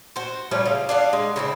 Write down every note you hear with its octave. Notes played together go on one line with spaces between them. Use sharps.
F#4 C5
F3 G3 A3 C#4
C#3 F5
D4 F5 F#5
G#3
C#3 C4 E4